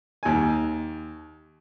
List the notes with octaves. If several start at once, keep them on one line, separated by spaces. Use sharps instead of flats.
D#2 G#5